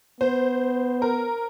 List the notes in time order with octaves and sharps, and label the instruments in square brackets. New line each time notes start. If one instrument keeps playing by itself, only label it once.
[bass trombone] B3 [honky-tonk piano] C5
[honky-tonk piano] A#4